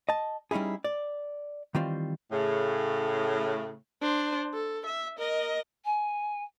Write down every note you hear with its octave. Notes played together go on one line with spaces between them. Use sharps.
D#5 A5
G3 C#4 D#4 E4 G#4
D5
D#3 E3 G3 C4 F4
A2 C#3
D4 C5
A4
E5
A#4 D#5
G#5